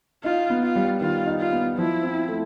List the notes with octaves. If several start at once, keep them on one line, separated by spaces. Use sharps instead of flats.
D#4 F4
B3
F4
G3
D#3 F4
D#4
F4
B3
F3 E4
C4
A3